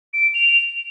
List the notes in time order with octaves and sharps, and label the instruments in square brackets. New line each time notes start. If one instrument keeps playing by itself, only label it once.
[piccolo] D7
F7